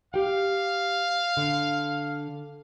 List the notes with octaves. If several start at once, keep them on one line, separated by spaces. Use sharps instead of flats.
G4 F5 G5
D3